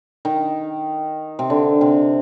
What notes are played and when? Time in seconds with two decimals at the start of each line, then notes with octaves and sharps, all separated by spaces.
0.25 D#3
1.39 C3
1.50 D3
1.81 C3